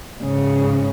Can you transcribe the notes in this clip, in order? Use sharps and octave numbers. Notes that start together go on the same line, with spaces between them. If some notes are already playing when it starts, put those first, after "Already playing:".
G#2 C#3